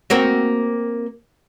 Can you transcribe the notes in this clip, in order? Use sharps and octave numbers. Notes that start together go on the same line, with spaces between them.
A#3 C4 F#4